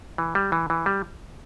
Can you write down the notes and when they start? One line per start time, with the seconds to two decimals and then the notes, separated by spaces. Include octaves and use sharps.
0.18 E3
0.35 G3
0.52 E3
0.70 E3
0.86 G3